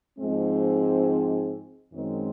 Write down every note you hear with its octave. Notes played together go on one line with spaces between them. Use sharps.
G#2 F3 G#3 C4
F#2 D#3 G#3 C4